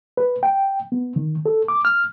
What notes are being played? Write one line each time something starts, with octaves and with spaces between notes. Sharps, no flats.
B4
G5
B3
D#3
A4
D6
F6